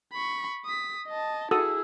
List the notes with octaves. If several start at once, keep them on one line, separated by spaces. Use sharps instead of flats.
B5 C#6
D#6 B6
D#5 A5
E4 F#4 G#4 A4 D#6 E6